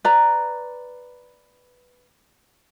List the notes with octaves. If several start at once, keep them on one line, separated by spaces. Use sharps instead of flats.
B4 D5 A#5